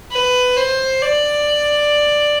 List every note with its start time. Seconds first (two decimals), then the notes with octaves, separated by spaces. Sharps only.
0.11 B4
0.57 C5
1.02 D5